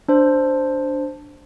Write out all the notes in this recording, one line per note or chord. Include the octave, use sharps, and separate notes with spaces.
D4 C5